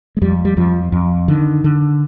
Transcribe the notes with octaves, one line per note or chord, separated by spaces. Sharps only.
G#3
F2 G3
G3
F2 F3
F2
D3 D#3
D3